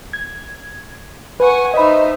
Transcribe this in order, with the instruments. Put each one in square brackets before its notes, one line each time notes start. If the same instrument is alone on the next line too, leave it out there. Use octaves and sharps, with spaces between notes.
[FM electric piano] G#6
[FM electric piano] B4 [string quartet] F#5 G#5 C#6
[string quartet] D#4 C5 E5 [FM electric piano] D#5 B5